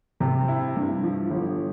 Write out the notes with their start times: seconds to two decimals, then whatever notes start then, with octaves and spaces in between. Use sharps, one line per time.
0.20 C3
0.48 E4
0.76 G2
1.03 F3
1.31 G1